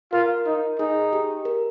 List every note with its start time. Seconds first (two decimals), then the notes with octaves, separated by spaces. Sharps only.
0.13 F4 A#4
0.46 D#4
0.79 D#4 G#4
1.13 G4
1.45 A#4